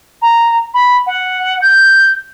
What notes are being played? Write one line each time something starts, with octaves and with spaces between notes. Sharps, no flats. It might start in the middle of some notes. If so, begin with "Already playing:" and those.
A#5
B5
F#5
G6